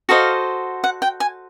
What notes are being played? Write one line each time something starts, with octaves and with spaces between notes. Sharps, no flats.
F#4 A4 C5 D#5 F5
F#5
G5
G#5